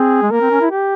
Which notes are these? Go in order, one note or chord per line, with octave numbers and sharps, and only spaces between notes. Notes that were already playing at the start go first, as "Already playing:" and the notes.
Already playing: C4 G#4
G#3
A#3 A#4
C4
C#4
E4
G4